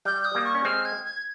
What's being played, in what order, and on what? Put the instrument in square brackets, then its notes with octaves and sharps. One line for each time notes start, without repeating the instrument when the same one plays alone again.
[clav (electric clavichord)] G3 [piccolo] G6
[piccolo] D#6
[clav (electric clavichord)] G3 A#3
[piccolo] C#6
[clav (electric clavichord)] C#4
[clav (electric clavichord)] G#3 C4 [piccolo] F6
[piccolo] G#6
G#6